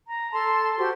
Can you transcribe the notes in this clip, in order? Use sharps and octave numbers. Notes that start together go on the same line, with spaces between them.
A#5
A4 A5 C6
F#4 G4 C5 C6